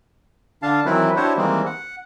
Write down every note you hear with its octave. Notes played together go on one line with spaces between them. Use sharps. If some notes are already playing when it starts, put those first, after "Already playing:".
D3 D4 F5 A5
D#3 E3 F#3 C4 E4 B4
D4 E4 F#4 G4 C5 C#5
D#3 E3 G3 G#3 A#3 C4
F#5